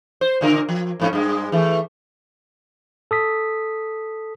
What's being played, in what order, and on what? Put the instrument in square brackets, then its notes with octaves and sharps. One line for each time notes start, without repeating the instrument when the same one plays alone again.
[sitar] C5
A#2 D3 A#4
F3
F2 G#2 C#4
G2 G#3
E3 A3
[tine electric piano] A4 D#6 B6